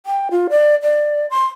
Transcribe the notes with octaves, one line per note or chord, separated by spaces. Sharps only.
G5
F4
D5
D5
C6